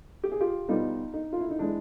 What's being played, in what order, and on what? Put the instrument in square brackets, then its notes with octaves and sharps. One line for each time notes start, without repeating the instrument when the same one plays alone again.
[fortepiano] G4
G#4
F4 G4
B2 G3 B3 D#4 F4
D#4
F4
E4
D#4
E3 G#3 D4